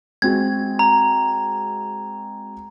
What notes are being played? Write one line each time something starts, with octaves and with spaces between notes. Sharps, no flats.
G#3 C4 F#4 G#6
A#5